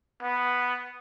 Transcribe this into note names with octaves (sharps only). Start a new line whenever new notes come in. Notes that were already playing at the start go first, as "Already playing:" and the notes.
B3